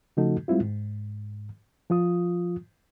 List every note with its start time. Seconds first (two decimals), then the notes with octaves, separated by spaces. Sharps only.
0.17 C#3 F3 A3 D#4 F#4 A4
0.48 G3 G#3 C4 E4 F4
0.62 G#2
1.90 F3 F4 D#6